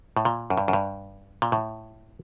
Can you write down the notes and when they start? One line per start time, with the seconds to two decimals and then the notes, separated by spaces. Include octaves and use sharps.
0.17 A2
0.25 A#2
0.50 F#2
0.57 G2
0.68 F#2
0.73 G2
1.42 A#2
1.52 A2